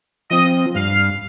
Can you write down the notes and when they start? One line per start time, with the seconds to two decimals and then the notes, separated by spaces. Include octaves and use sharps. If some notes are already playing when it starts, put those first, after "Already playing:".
0.31 F3 C4 D#5
0.75 G2 F5